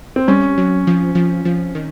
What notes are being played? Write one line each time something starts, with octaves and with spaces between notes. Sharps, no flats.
C4
G3 C#4
F#3
F3
F3
F3
D#3